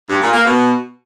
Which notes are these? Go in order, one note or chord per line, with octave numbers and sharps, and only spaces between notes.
G2
A#2
A#3
B2